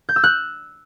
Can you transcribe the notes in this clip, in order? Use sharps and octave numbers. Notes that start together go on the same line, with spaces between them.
G6
E6
F#6